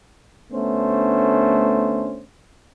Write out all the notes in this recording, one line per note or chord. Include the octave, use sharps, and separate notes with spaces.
D2 A3 B3 C#4 D4 C5